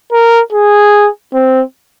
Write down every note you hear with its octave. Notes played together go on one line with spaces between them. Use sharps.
A#4
G#4
C4